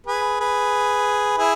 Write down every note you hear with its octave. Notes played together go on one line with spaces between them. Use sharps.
G#4 B4
G#4 B4
E4 G#4